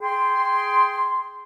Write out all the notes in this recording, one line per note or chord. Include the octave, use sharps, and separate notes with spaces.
G#4 G5 C6